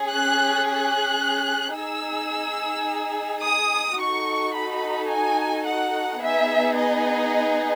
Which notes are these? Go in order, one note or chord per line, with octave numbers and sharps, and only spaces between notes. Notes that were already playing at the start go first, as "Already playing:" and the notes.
Already playing: C#4 G#4
F#6
F#6
D#4 G#4 E6
D#6
D#4 F#4 A4 C#6
B5
G#5
F#5
B3 D#4 G#4 E5
D#5